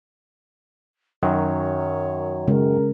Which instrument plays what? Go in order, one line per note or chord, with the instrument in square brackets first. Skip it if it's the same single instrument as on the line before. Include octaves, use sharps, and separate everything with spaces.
[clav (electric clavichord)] F#2 D#3 F#3 [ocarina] C#5
[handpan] C#3 G#3 [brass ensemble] A#4